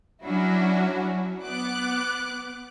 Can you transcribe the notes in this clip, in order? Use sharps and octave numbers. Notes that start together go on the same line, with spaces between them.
F#3 C#4 D4 E4 F#4
B3 D6 F#6